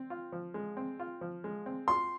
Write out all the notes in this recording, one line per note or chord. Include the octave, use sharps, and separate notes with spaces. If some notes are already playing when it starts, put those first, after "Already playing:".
Already playing: C4
F4
F3
G#3
C4
F4
F3
G#3
C4
F4 C6